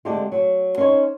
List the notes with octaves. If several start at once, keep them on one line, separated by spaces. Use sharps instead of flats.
D3 G#3 A3 C4 G4
F#3
C#4 D#4 E4 C5 C#5